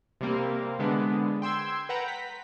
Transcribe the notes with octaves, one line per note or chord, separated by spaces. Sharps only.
C3 G3 A#3 C4
D3 G#3 B3 D4
G5 C6 E6 G#6
B4 F#5 G5 A#5
B6